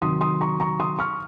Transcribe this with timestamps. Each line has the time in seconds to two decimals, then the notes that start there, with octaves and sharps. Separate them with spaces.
0.01 C3 D#3 F#3 C6 D#6
0.21 C6 D#6
0.41 A#5 C#6
0.60 A#5 C#6
0.80 C6 D#6
0.99 C#6 F6